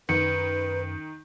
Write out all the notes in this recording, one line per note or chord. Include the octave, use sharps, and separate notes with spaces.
F#2 D#3 B4 C#7